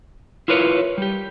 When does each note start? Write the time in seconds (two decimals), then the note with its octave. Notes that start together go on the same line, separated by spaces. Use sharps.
0.48 E4 F4 A#4 B4 C#5
0.98 G3 G4